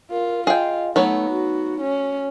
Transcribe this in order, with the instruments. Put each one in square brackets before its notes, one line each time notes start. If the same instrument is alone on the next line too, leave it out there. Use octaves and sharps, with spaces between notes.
[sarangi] F4 [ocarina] A#4
[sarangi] F4 [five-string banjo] G#4 G5 [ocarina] D#5
[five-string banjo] F#3 B3 C#5 [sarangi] A3 [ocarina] D#4
[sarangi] F#4
C#4